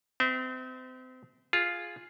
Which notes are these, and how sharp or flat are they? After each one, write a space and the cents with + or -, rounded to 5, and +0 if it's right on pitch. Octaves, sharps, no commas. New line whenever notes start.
C4 -35 E5 -30
F4 +0 G#4 +0